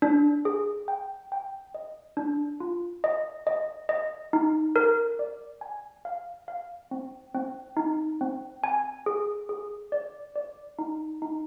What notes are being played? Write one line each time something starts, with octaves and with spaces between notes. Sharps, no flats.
D4
G#4
G5
G5
D#5
D4
F4
D#5
D#5
D#5
D#4
A#4
D5
G#5
F5
F5
C4
C4
D#4
C4
G#5
G#4
G#4
D5
D5
D#4
D#4